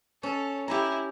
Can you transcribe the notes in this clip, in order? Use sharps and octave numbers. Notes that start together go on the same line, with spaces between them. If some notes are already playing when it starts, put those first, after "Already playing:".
C#4 A4 C#5
E4 G4 G#5 A#5